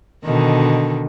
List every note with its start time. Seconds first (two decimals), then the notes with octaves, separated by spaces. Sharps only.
0.24 B2 D3 D#3